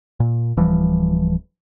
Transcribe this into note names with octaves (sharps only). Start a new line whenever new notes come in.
A#2
D1 E3 F3 G3